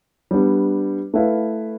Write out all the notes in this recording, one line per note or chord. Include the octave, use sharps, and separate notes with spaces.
G3 B3 D4
A3 E4 B4 F5